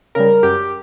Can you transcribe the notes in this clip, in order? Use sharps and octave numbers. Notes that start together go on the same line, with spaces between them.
C#3 G3 A#4
F#2 G4